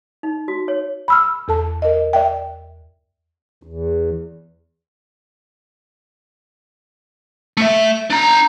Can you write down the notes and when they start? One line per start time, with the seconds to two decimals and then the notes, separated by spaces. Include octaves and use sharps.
0.23 D#4
0.48 F#4
0.68 C#5
1.08 B5 E6 F6
1.48 E2 A4 A5
1.82 A#4 D#5
2.13 D5 E5 G5
3.63 E2
7.57 A3 E5
8.10 D4 A#5